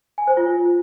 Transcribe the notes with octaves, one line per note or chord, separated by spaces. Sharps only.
G#5
C5
F4